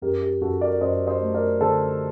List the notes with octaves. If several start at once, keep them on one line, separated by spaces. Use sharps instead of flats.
F#2 G4 A#4
G4
F#2 F#4 A4
A#4 D5
F#2 C5 D#5
C5 D#5
A3
A#4 D5
D3 A4 C5